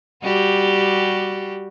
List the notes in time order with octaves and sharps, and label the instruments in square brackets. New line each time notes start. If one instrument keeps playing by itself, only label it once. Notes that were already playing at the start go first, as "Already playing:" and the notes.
[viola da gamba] G3 F#4 G4